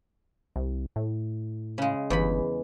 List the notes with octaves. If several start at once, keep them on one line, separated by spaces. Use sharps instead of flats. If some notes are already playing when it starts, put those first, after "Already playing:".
C2
A2
C#3 G#3
G1 E2 B5